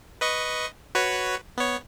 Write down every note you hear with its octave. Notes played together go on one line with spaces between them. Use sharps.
B4 D#5 C#6
F#4 B4 C#5
B3 C#5